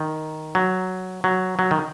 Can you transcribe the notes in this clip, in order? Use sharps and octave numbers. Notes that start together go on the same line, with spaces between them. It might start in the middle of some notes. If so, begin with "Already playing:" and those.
Already playing: D#3
F#3
F#3
F#3
D#3